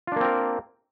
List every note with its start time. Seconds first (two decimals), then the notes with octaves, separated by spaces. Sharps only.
0.07 F4
0.12 D4
0.16 A#3
0.21 C4
0.25 A#4